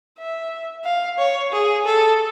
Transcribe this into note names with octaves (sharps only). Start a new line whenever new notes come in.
E5
F5
C#5
G#4
A4